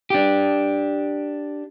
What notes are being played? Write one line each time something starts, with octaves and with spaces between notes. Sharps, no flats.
D4 G4